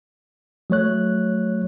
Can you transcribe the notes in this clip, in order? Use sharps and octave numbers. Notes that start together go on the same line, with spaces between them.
F#3 A3 C#5 F#6